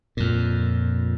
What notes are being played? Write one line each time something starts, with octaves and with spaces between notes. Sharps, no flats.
F2 A#2